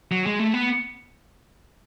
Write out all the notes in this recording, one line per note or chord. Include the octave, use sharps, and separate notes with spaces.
F#3
G#3
A3
B3